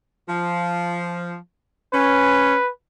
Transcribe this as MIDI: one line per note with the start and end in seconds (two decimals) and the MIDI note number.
0.28 1.34 53
1.93 2.55 61
1.93 2.70 71